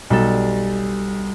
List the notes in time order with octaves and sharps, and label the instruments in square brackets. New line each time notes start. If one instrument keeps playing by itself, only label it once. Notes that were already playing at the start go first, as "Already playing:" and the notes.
[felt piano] B1 [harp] G3 A4